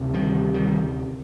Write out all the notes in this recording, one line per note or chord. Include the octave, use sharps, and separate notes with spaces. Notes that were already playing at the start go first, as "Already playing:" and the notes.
Already playing: D2 C3
D#3 G3
D#3 G3